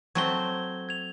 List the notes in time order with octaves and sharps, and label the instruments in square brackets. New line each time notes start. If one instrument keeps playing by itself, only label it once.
[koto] F#3 A3 C4 [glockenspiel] G#6 G7
[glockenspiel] G#6 F7